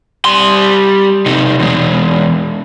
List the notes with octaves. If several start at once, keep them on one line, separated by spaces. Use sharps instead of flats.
G3 C6
C3 D#4
E2 G#3